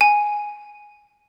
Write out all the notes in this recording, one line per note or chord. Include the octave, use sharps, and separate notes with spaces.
G#5